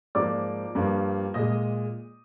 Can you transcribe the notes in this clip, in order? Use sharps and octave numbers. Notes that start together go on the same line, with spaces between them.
G#2 F3 A#3 D5 D6
G2 F3 A#3
A#2 G#3 D#5 D#6